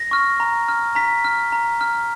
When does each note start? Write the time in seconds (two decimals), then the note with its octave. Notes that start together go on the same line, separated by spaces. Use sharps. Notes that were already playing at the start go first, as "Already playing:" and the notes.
Already playing: A#6
0.11 C#6 F6
0.40 A#5
0.68 F6
0.95 A#5 B6
1.24 F6
1.52 A#5
1.81 F6